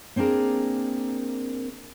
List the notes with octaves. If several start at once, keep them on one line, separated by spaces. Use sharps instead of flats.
A#3 C4 D4 G#4 A#4